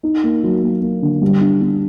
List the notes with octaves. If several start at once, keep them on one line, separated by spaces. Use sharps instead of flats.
D#4
A#3
F#3
A#3
A#3
D3
G3
D4
D4